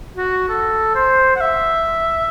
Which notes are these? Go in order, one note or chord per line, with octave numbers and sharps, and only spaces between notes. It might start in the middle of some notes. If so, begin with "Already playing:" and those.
F#4
A4
C5
F#5
E5